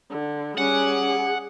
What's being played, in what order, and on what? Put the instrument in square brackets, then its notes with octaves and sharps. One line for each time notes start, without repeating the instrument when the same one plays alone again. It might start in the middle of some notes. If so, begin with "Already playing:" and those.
[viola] D3
[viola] G3 D6 [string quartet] C#4 [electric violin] G#4 [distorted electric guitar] F#5